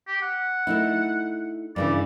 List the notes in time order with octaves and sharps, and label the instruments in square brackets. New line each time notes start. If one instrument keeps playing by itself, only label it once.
[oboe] G4
F#5
[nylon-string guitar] A3 D#4 E4
[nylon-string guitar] G2 C#3 E3 [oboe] D5